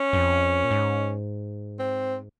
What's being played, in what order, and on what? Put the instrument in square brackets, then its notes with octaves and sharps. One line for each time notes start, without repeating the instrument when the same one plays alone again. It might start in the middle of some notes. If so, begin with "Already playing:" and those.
Already playing: [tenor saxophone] C#4
[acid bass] G2
F2
A#2
G#2
[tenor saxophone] C4